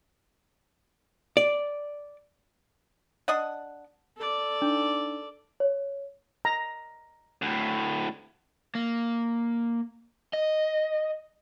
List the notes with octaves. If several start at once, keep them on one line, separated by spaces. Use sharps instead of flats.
D5
D4 D#5 F#5
A4 D5
D4 D#4
C#5
A#5
D2 A2
A#3
D#5